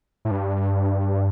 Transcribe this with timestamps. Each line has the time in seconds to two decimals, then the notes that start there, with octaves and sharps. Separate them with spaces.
0.25 A2
0.31 G2